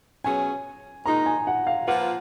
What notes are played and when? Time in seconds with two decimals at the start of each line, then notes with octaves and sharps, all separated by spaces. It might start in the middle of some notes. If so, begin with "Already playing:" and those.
0.24 B2 F#3 C#4 G#4 G#5
1.06 A#2 G#3 D#4 A#5
1.26 G#5
1.47 F#5
1.67 F5
1.87 F3 A#3 F4 B4 F#5